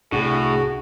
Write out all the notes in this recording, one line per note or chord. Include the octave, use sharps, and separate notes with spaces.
C2 A2 D4 F#4 G#4